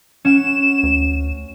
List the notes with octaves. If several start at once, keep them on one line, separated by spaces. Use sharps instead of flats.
C#4 F#5 E7
D2